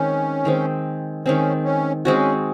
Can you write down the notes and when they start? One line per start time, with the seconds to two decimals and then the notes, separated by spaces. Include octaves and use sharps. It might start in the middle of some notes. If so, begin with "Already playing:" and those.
Already playing: D#3 G#3 C4 C#4
0.45 D#3 G#3 C4
1.25 D#3 G#3 C4 C#4
1.65 C#4
2.05 G#3 C4 C#4 F#4